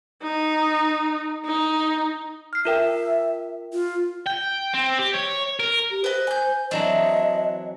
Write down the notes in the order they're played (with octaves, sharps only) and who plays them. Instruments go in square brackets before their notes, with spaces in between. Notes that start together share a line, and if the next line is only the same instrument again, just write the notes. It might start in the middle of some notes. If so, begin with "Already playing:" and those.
[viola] D#4
D#4
[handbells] F6 C7
[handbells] F4 A#4 G5 [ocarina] E5
[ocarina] F4
[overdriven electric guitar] G5
C4
G4
C#5
A#4
[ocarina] G4
[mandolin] B4 D#5 [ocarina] C5
[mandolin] G#5 G6
[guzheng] E3 F#3 C4 [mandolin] D4 [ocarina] D#5